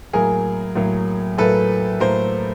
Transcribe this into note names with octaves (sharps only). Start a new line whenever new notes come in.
A2 F#3 A#3 G#4 A#4
A2 F#3 A#3
A2 F#3 A#3 A4 B4
A2 F#3 A#3 A#4 C5